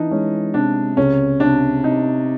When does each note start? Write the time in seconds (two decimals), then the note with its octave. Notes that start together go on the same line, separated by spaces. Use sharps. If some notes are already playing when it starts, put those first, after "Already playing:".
Already playing: E3 D4 D#4
0.11 G#3 C#4
0.54 C3 D4
0.97 C#2 C#4
1.40 C3 D4
1.83 C3 D#4